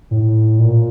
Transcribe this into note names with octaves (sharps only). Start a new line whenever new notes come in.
A2
A#2